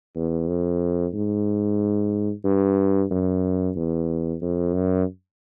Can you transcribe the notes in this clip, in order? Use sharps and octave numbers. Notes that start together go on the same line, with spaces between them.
E2
F2
G#2
G2
F#2
E2
F2
F#2